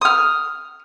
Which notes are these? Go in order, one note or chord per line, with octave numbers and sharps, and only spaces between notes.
D#6 F6